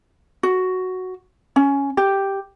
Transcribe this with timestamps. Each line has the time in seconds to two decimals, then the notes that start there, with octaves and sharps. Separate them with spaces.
0.43 F#4
1.56 C#4
1.97 G4